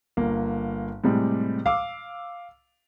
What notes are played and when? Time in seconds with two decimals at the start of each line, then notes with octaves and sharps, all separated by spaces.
0.17 G1 A#3
1.04 A2 C3 G3 G#3
1.66 F5 D6 E6